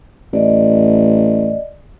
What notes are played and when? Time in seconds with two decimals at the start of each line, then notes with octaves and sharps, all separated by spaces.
0.33 A1 D5 D#5